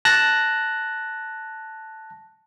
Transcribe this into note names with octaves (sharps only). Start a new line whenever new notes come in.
A5 F#6 A#6